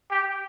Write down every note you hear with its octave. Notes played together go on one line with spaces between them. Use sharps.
G4